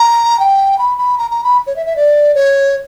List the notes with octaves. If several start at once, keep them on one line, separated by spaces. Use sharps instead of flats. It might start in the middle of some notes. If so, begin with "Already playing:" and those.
Already playing: A#5
G5
B5
B5
A#5
A#5
B5
C#5
E5
E5
D5
C#5